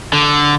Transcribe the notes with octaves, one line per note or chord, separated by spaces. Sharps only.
D3